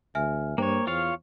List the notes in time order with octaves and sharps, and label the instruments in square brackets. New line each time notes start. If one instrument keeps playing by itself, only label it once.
[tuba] D2 [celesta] E5 G#5 F6
[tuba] G2 [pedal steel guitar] A#3 C#5 [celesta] C5 G5
[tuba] E2 [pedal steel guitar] F4 C#5 F5